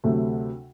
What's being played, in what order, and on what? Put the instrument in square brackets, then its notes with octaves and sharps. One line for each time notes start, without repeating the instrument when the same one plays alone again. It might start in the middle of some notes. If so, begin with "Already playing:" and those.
[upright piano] D2 C3 F#3 A3